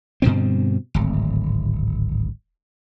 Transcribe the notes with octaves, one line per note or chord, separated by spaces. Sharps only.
G2 B2 D3 C4
D1 G#1